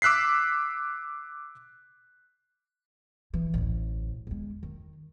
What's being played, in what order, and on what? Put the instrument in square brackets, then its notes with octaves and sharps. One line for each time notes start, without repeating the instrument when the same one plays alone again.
[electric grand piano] D6 E6 F#6 B6 C7
[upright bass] E3
A1 D2
E2 G#3
D#3